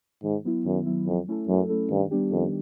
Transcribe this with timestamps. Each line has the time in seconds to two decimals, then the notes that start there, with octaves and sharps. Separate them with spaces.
0.23 G#2 D#3
0.44 F#3 B3 E4
0.65 F#2 D#3
0.86 F#3 B3 E4
1.06 F2 F#3
1.28 A3 C#4 E4 A4
1.48 F#2 F#3
1.69 A3 C#4 E4 A4
1.90 G2 D#3
2.11 G3 B3 D4 G4
2.32 F2 D#3